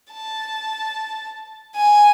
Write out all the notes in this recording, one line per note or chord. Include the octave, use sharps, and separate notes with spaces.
A5
G#5